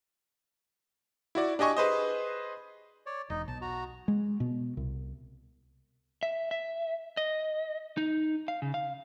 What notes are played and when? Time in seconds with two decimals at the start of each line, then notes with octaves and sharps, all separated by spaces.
1.35 E4 F#4 D5
1.59 D4 G4 D#5 G#5 C#6
1.77 G#4 B4 C5 D#5
3.06 C#5 D5
3.30 E1 D#4 D#5
3.48 B1 A5
3.62 F#4 A#5
4.08 G#3
4.40 B2
4.77 C2
6.23 E5
6.51 E5
7.17 D#5
7.97 D#4
8.48 F5
8.62 C#3
8.74 F5